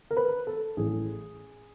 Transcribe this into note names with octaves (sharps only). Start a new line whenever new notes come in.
A#4
B4
A4
A1 A2 E3 G#4